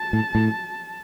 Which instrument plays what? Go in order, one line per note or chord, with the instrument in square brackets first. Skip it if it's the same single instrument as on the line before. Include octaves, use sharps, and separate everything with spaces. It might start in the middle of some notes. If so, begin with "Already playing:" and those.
Already playing: [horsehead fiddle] A5
[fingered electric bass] A2
A2